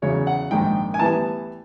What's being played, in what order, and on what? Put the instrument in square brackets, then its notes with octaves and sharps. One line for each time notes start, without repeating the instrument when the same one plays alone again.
[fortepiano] E2 C#3 F#3 C#5
F#5
A#1 G#2 D#3 G5
G#5
A2 E3 G3 B3 A5